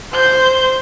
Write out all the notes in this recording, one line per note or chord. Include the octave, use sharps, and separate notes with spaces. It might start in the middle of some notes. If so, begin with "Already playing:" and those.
C5 G6